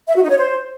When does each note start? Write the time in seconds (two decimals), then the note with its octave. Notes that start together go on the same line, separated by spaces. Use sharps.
0.07 E5
0.15 F#4
0.22 D#4
0.30 C#5
0.37 C5